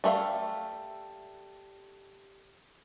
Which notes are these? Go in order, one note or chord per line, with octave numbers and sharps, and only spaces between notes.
G3 A3 C5 E5 F5